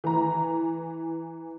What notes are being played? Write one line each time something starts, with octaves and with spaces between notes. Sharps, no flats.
E3 A#5